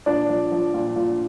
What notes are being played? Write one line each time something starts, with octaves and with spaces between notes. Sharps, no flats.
A#2 D4 D5
F3
F3
A#2
A#2